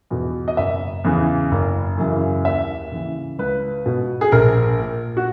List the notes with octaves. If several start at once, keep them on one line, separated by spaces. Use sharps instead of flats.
E2 B2
D#5
F#1 E5
E2 C#3 E3
F#1
F#2 C#3 E3
D#2 E5
C#3 E3
C#2 B4
B2
G#4
A#1 A#4
A#2
F#4